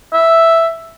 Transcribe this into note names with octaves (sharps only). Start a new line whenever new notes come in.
E5